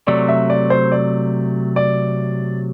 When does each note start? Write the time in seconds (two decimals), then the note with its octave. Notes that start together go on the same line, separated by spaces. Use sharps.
0.07 C3 F#3 A3 D5
0.28 E5
0.50 D5
0.70 C5
0.92 D5
1.76 D5